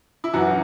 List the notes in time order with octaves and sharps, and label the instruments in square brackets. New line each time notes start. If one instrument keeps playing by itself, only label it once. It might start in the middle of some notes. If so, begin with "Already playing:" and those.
[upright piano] E4
F#2 E3 F#4